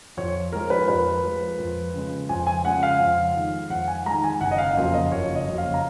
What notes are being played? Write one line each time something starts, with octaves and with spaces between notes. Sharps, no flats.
F2 C#5
F3 G#3 A#4
B4
F2 B4
F3 G#3
F2
C#3 G#3
F2 G#5
G#5
C#3 G#3 F#5
F5
F2
D#3 G#3
F2 F#5
G#5
D#3 G#3 A#5
G#5
F#1 F#5
D#5
F5
F2 C#3 F#3 A#3
D#5
F#1 C#5
D#5
F2 C#3 F#3 A#3
F5
A#5